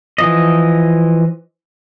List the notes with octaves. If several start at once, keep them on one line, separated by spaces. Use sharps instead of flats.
E3 F3 D#5